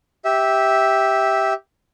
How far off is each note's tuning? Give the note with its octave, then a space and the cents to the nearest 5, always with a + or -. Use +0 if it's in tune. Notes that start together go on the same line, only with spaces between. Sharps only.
G4 +0 E5 -10